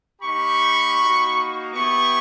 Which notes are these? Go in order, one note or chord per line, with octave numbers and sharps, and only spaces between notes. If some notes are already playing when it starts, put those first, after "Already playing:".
A#3 D#4 G4 B5 C#6
A#3 D#4 F#4
B3 E4 G4 B5 C#6